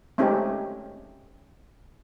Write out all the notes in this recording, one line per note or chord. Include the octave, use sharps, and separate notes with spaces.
G#3 A3 C4 C#4 D#4 G4